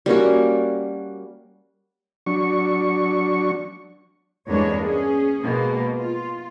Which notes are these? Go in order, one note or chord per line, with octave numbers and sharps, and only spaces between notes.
G3 A#3 C#4 F#4
F#3 D4 C#6
E2 G2 G#3 A#3 D4 C#5
C#4 G#4
B2 G#3 A#3
F4